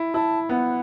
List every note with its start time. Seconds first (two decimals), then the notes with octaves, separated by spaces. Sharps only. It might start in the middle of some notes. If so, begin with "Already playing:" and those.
Already playing: E4
0.14 E4 A5
0.49 B3 F#5